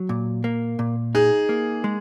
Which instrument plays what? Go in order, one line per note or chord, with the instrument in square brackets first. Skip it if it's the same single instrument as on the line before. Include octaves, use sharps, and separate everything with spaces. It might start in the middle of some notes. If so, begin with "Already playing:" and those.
Already playing: [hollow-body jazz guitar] F#3
A#2
A#3
A#2
[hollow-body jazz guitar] D#4 [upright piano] G#4
[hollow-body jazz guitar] A#3
G#3